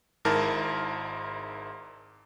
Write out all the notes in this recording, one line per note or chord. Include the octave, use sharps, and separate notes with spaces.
G#1 G#2 E4 A#4 A5